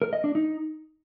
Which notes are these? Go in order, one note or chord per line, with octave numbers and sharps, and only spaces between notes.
A#4
D#5
D4
D#4